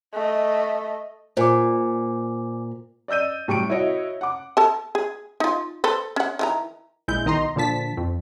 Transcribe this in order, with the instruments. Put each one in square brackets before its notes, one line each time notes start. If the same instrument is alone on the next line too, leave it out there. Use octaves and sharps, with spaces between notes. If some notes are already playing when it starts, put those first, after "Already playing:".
[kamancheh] A3 D#5
[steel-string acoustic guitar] A#2 [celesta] C5 G#5 D6
[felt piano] D5 D#5 E6 G6 D#7
A2 G3 C#6 C#7 D7
E4 F#4 C#5 D#5
F#5 D6
[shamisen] A4 A5
G#4
D#4 F4
A4 B4 C5
C#4 F#5
D#3 E3 A#5
[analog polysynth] A#1 G#3 E4 G6
B1 D#3 D#5 A#5 C6
A#2 D3 F3 A5 B6
F2